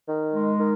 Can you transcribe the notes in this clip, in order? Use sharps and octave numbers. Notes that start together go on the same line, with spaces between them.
D#3
G#3
D#3